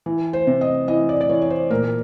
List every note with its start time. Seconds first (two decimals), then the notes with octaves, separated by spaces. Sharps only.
0.06 E3
0.33 C5
0.47 C3
0.61 D#5
0.88 E3 D#5
1.09 D5
1.21 D5
1.29 E3 C#5
1.41 C#5
1.50 C5
1.70 A#2 A#4